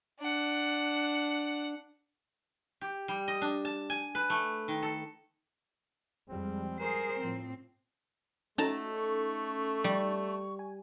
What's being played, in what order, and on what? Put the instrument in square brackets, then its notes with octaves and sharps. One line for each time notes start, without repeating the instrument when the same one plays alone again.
[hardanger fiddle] D4 F#5
[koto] G4
G3
D#5
D4
A5
G#5
B4
A3
D#3
A4
[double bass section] F2 G3 G#3 [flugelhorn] C4
[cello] G#4 C5 [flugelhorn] A#4
[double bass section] A2 F3 [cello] C4
[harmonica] A3 [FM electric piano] C#4 D#4 A4 [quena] F#4 [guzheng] A5 A#5
[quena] C#6
[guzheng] G3
[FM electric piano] G#5